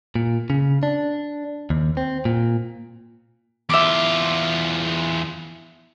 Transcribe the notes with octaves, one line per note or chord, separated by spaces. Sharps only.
A#2
C#3
D4
D#2
C4
A#2
E2 F4 E5 D6